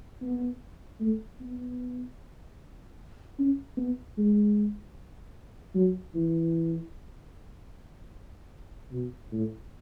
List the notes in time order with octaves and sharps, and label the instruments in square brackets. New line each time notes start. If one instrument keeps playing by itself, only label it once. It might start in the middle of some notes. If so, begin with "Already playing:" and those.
[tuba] B3
A3
B3
C#4
B3
G#3
F#3
E3
B2
A2